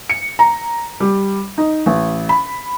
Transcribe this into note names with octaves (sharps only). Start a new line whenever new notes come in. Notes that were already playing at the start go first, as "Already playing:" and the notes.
C#7
A#5
G3
D#4
A1
B5